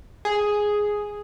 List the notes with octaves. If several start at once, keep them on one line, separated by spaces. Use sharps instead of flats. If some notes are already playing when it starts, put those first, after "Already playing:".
G#4